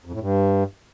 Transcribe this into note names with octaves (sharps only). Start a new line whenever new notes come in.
F2
A2
G2